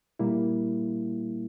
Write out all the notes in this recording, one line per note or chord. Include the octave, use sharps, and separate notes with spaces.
A#2 G3 A#3 E4